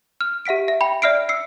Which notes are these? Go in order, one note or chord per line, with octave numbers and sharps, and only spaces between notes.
F6
G4 E5 F#5 B6 D7
E5
G5 B5
D5 E5 F6 C7 D7
E6 C7 C#7